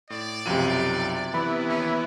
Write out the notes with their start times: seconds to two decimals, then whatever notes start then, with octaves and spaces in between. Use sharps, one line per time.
0.10 A2 D5
0.46 B1 F#2 C3 F3 D#7
1.34 E3 B3 B5
1.68 D#2 C#4